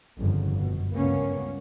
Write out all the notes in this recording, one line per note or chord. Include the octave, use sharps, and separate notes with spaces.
G1 F2 C#3
F#2 B2
C#2 G2 A#3 B3 C#4